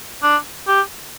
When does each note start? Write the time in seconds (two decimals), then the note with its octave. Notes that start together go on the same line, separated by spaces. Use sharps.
0.23 D4
0.68 G4